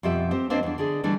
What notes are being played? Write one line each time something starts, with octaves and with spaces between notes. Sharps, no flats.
F2 B2 F3 G4 E5
C4 G4 C5
A#3 C4 D4 C5 C#5 D#5
E2 D4
D3 G#4 D5
D3 E3 G3 A3 D4